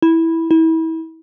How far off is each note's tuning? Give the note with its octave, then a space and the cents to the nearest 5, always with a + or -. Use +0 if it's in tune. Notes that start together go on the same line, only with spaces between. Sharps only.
E4 -10
E4 -30